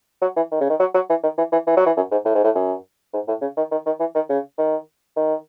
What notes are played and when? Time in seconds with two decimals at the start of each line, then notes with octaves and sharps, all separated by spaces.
0.22 F#3
0.36 E3
0.52 D#3
0.61 C#3
0.70 D#3
0.80 F#3
0.94 F#3
1.10 E3
1.23 D#3
1.38 E3
1.52 E3
1.67 E3
1.77 F#3
1.86 E3
1.96 F#2
2.11 G#2
2.25 A2
2.35 G#2
2.44 A2
2.55 F#2
3.13 G#2
3.28 A2
3.41 C#3
3.57 D#3
3.71 D#3
3.86 D#3
4.00 E3
4.15 D#3
4.29 C#3
4.58 D#3
5.17 D#3